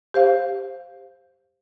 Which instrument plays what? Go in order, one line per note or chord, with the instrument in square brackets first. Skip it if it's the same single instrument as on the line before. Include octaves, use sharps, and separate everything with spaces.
[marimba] G4 C5 F5